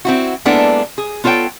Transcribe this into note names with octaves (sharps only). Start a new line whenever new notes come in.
C4 E4 F#4
G#3 A#3 B3 D4 E4 A4
G#4
B3 F4 A4 C#5 G5